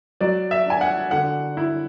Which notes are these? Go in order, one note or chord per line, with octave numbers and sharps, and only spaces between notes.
F#3 D5
E5
D4 G#5
F#5
D3 F#5
E4